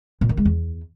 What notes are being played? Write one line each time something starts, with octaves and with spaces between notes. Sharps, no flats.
A#2
D#3
G#3
E2